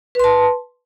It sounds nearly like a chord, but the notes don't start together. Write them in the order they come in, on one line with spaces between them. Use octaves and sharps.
B4 C6 A5